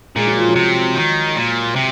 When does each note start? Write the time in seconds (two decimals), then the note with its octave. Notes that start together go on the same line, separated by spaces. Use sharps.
0.16 A#2 G#3
0.27 F#3
0.38 F3
0.49 F#3
0.56 C3
0.95 D#3
1.36 A#2
1.76 C3